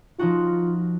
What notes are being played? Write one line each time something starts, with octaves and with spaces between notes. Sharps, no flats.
F3 D#4 F4 F#4